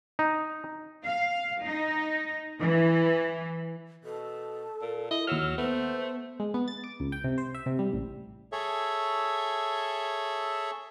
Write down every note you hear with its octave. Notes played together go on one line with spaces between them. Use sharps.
D#4
F5
D#4
E3
B2 A4
A#2
E4 D#5
D#2 F#3 E6 F6
A3 B3 C5
G#3
B3
A6
D6
C#2
G5
C3
C5
E5
C3
G3
A1
G#4 A4 C#5 E5